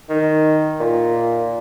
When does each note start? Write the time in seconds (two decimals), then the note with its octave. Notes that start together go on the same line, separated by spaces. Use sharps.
0.09 D#3
0.80 A#2